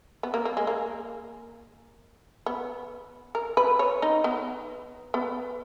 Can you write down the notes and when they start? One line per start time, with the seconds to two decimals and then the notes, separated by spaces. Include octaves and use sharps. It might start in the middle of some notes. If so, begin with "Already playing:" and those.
0.23 B3
0.34 A#3
0.45 A#3
0.57 G#3
0.67 A#3
2.46 B3
3.35 A#4
3.57 B4
3.79 C#5
4.02 D#4
4.24 B3
5.14 B3